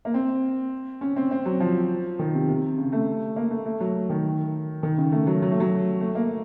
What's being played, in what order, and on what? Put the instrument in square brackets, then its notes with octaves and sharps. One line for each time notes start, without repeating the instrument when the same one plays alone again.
[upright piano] A#3
C4
C#4
C4
C4
F#3
F3
D#3
C3
C3
C#3
A3
A#3
A3
A3
F#3
D#3
D#3
C#3
A3
F#3
F#3
A3
F#3
A3
A#3